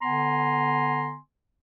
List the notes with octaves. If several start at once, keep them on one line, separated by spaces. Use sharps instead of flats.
D3 B3 G#5 A#5 C6